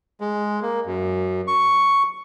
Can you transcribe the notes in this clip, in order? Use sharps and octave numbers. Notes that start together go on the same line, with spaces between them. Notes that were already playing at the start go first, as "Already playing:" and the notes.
G#3
A#3
F#2
C#6